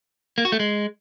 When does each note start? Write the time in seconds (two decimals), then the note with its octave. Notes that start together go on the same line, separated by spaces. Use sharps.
0.38 A#3
0.45 F#4
0.52 A3
0.60 G#3